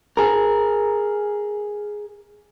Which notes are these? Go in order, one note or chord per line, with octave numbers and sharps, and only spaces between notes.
G#4 A#4